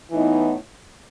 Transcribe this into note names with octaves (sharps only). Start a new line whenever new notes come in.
A2 E3 B3 D#4